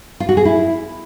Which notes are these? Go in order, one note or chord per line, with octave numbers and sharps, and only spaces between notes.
F4
F#4
G#4
E4